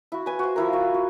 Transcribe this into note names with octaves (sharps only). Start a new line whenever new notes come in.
E4 F#4
B4 G#5
F#4 C5
F3 E4 A#4
F#4
F#4